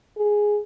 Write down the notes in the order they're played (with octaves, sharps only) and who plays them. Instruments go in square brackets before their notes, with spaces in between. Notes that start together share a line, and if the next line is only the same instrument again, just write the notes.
[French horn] G#4